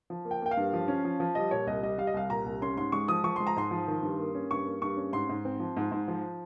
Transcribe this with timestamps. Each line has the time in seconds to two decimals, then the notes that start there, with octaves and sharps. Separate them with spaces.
0.10 F3
0.25 A#3
0.31 G5
0.42 A#3 G5
0.51 F5
0.57 G2
0.73 F3
0.88 C#4
1.05 F3
1.20 F3
1.35 G3 D#5
1.51 A#2 C#5
1.67 C2 D#5
1.83 G3 D#5
1.98 G3 F5
2.07 D#5
2.14 C2 F5
2.30 A#2 A#5
2.46 C2
2.61 C#4 C6
2.77 G#2 C6
2.92 G#3 C#6
3.08 F3 D#6
3.24 F3 C#6
3.36 G#3 C6
3.47 A#5
3.56 G#2 C6
3.71 F3
3.88 D#3
4.02 G2
4.19 A#3
4.35 C#4
4.51 G2 C#6
4.66 A#3
4.82 G2 C#6
4.97 C#4
5.13 G#2 C6
5.29 G#2
5.45 C4
5.60 F3
5.77 G#2
5.92 G#2
6.08 F3